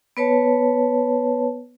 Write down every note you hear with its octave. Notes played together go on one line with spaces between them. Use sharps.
B3 B4 C#5 A5